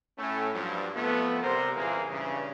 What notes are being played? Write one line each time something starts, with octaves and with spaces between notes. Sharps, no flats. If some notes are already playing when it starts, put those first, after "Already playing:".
A2 A3 C#4
G2 F3 F#3
C3 F3 A3 B3
A1 C3 G3 A#4 C5
C#2 A#2 E3 A#3 G#4 A#4
G2 C#3 E3